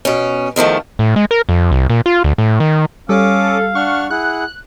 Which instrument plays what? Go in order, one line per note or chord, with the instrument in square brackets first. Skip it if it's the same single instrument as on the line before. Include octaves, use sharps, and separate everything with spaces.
[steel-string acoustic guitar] B2 C#4
E2 D#3 F3 A3
[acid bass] A2
G#3
A#4
F2
C2
A#2
F4
D2
A2
D#3
[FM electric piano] G3 [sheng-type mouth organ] C#4 D6 D#6 [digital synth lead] A4 [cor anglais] F5
[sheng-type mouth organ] D4 F#5 F6 [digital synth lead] C#6
[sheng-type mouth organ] E4 G#4 F#5 [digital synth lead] F#6